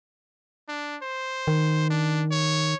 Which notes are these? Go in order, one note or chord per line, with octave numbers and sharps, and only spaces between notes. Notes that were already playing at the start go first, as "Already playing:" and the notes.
D4
C5
D#3
D4
C#5